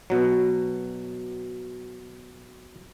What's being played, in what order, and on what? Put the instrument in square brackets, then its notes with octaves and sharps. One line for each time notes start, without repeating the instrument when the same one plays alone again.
[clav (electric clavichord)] B2 F#3